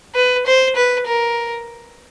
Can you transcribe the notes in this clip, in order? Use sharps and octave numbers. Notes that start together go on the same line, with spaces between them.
B4
C5
B4
A#4